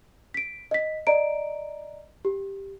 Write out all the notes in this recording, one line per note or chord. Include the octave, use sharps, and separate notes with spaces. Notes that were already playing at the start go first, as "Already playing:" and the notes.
B6 D7
D#5 B6
D5 D#5 A#5 D7
G4